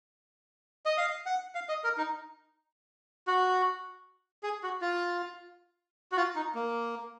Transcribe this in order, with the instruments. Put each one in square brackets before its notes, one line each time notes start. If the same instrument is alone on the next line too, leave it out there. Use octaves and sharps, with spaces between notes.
[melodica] D#5
F5
F#5
F5
D#5
A#4
D#4
F#4
G#4
F#4
F4
F#4
F4
D#4
A#3